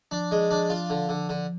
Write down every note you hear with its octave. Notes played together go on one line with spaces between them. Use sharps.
F3 D4
G#3
D4
F4
D3
D3
D3